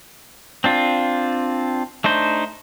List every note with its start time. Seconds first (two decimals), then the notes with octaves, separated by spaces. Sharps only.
0.64 C4 D4 F4
2.04 A3 D4 D#4 C5